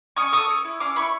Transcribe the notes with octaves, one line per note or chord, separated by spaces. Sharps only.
C#4 C#6 D#6
A4 C#6 D#6
C#4
E4
C#4 C6 D6
E4 B5 C#6